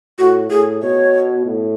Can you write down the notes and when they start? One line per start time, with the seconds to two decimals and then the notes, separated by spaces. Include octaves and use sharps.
0.18 A2 F#4
0.50 A2 G#4
0.82 B2 C#5
1.46 A2